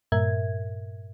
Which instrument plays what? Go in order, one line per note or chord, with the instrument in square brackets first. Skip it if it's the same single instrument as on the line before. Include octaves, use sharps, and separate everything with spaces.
[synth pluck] G2 A#2 A#4 E5 G#6